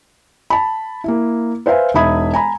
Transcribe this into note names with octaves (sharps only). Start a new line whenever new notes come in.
A5 B5
A#3 E4
B4 C5 E5 F5 G#5
E1 D#4 E5 B5 D#6 G#6
G#5 A#5 B5